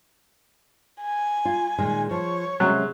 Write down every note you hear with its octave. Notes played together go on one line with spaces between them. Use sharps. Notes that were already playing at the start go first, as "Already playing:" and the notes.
G#5
F4
A#2 D#3 G#3
F3 C#5
C3 F#3 G#3 C#4